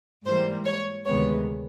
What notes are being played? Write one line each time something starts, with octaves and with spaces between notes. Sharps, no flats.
G#2 E3 G3 A#3 C5
C#5
D2 C3 D#3 G#3 B3 C#5